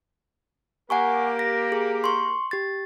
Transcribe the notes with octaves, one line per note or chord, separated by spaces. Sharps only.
A#3 G4 A#4 F#5 G#5 C#6
A#6
G#4
C6 C#6
G4 A6